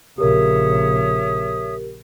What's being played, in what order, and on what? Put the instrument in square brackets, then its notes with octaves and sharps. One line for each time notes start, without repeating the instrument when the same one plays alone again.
[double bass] A#1 C#3 [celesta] G4 A#4 [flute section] C#5 E5 D#6